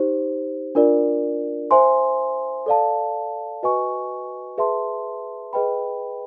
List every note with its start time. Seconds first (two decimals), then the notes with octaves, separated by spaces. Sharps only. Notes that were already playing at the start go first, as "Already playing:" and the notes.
Already playing: D#4 G4 C5
0.75 D4 F4 A#4 D5
1.71 C5 E5 G#5 C6
2.66 A4 D5 F5 A5
3.63 F#4 B4 D#5 G#5 C#6
4.58 G#4 B4 E5 A5 C6
5.53 G#4 B4 D#5 G5 B5